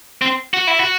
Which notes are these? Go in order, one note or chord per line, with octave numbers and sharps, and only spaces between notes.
C4
F#4
E4
F#4